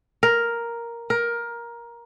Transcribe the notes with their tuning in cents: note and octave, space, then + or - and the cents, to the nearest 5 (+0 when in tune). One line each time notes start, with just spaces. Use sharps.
A#4 +5
A#4 +15